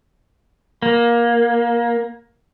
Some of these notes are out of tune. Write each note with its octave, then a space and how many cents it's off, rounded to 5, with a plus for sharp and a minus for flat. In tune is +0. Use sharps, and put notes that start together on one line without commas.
A#3 +20